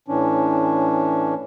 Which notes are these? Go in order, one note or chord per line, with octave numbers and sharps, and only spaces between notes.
A2 E3 C#4 D4